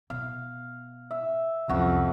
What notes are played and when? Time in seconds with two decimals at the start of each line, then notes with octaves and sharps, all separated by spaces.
0.10 B2 F5
1.11 E5
1.69 C2 F2 C#4 F#4